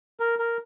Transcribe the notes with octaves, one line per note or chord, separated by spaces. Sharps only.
A#4
A#4